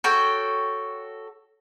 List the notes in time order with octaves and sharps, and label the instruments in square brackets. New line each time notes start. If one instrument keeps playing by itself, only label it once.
[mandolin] F#4 A4 C#5 G5